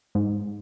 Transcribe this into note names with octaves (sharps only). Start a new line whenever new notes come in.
G#2